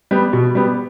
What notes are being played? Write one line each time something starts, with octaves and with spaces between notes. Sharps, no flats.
G3 B3
B2
G3 B3